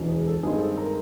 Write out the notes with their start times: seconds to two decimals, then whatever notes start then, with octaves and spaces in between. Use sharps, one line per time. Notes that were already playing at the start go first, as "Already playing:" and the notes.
Already playing: E1 D2 C#3 E3 G#3
0.09 G#4
0.27 A4
0.43 G2 D#3 G#3 C4 G#4
0.60 A4
0.77 A#4